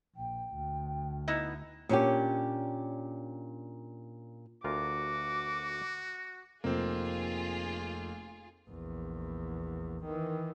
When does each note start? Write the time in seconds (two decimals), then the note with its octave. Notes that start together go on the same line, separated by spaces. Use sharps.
0.16 A#1 G5
0.54 D2
1.28 B3 D#4 E4
1.89 A#2 C#4 D4 G4
4.64 D2 F4 F#4 A#4 D6
6.64 F1 F3 A#3 C4 F4 G#4
8.69 A#1 E2
10.04 D#3 E3